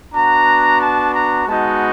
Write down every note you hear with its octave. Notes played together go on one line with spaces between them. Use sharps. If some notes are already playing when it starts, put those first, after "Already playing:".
B3 D4 F#4 A#5
A5
A#5
G#3 B3 D#4 F#4 A5